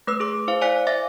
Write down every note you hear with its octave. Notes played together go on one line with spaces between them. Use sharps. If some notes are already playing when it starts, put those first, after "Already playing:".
A3 B4 E6
G#4 D6
E4 C5 F5
C5 D5 G#5 F#6 B6
E5 F5 D6 A6 A#6